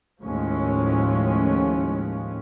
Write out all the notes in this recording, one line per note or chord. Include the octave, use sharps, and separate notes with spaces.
D#2 A2 F3 G#3 C#4